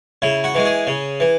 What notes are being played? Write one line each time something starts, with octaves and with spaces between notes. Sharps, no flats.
C#3 E4
F#4
E3 G#3
G#4
C#3
E3